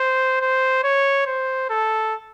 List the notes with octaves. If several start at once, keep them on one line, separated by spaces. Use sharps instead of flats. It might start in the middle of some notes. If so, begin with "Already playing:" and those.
Already playing: C5
C5
C#5
C5
A4